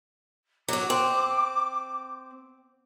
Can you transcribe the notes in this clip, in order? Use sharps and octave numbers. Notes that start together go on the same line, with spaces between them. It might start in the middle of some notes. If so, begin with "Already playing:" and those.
F#3 F#4 D6
C4